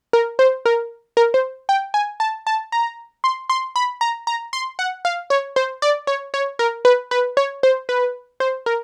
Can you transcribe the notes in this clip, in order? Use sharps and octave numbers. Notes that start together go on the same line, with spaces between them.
A#4
C5
A#4
A#4
C5
G5
G#5
A5
A5
A#5
C6
C6
B5
A#5
A#5
C6
F#5
F5
C#5
C5
D5
C#5
C#5
A#4
B4
B4
C#5
C5
B4
C5
A#4